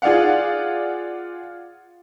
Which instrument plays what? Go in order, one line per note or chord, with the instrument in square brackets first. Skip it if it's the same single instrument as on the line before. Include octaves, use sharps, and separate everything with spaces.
[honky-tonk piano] F4 G#4 D5 F5 F#5